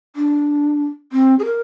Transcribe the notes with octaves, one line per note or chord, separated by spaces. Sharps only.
D4
C4
G#4
A#4